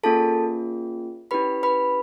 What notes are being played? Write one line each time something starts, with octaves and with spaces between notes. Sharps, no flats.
A#3 C#4 F4 G#4 A4 A5
C#4 E4 G4 B4 B5
B4 B5